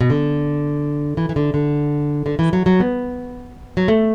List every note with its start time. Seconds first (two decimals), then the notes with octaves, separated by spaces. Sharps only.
0.01 B2
0.10 D3
1.17 E3
1.29 E3
1.36 D3
1.54 D3
2.26 D3
2.39 E3
2.53 F#3
2.66 F#3
2.80 B3
3.77 F#3
3.88 A3